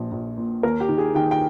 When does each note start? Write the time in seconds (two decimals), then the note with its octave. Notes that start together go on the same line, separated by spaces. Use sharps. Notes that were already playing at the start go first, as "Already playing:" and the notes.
Already playing: A#1 F3
0.12 A#1
0.38 A#2
0.63 D#2 A#4
0.80 G4
0.89 D#3
0.98 G#4
1.15 D#3 G5
1.31 G5